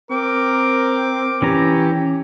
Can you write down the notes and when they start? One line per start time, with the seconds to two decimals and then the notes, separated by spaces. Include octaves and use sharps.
0.11 C4 A#4 D6
1.42 E3 C#4 G4 A#5